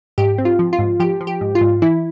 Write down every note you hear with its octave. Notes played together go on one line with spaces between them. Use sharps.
G#2 G4
C4
F4
F3
F4
G#2
F3 G4
F3
G4
G#2
F4
G#2
E3 E4